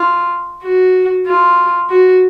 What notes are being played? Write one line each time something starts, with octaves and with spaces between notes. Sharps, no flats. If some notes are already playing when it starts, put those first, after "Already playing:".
Already playing: F4
F#4
F4
F#4